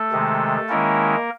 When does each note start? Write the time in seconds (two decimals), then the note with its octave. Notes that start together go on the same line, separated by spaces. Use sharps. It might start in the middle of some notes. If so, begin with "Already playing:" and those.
Already playing: A3 A4
0.12 C3 D#3 G#3
0.69 D#3 G#3 A#3 C#4 E4 A#4